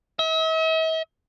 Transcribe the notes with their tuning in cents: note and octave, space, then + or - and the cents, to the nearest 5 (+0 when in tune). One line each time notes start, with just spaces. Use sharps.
E5 -45